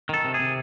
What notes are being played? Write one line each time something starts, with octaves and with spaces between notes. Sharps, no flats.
D#3 A4
C3
G#4
C3